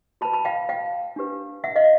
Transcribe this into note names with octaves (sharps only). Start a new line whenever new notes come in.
F#4 B4 A5 B5
A5 B5
F5 G5
F5 G5
D4 G4 B4
E5 F#5
D#5 F5